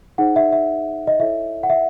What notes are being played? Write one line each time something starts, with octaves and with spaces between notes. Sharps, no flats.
D#4 G#4 C5 F#5
E5
E5
D#5
E4 A4 C#5 E5
F#5
E5